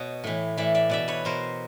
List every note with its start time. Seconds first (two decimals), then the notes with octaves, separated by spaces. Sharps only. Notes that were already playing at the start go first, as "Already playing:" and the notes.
Already playing: B2 C#5 D#5
0.24 A2 E3
0.57 A2 E3 D5 E5
0.75 D5 E5
0.89 B2 D5 E5
1.08 B4 C#5
1.25 B2 A#4 C5